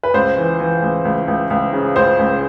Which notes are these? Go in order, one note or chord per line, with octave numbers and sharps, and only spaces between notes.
B4
C#2 C5
E3
E3
C#2
C#2
C#2
C#2
C#3
C#2 C5
C#2